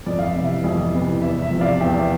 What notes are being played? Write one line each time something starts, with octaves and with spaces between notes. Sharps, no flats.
F2 D5
F5
E5
C3 E3
E5
F2 E5
C3 E3
E2 E5
E5
C3 F3
D5 F5
E2 E5 G5